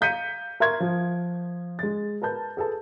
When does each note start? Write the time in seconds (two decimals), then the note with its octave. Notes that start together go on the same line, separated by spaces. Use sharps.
0.01 F5 A#5 G6 B6 C#7 D#7
0.60 A#4 E5 C6 C#6 G#6
0.80 F3
1.79 G#3 A6
2.22 A#4 B4 A5 G6
2.57 G#4 A4 B4 A5